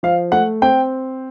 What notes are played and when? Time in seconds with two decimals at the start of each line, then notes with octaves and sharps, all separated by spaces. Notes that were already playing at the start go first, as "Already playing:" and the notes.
0.03 F3 F5
0.32 A3 F#5
0.62 C4 G5